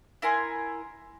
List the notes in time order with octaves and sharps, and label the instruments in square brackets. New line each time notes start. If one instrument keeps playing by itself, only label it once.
[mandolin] E4 A#4 G#5 C6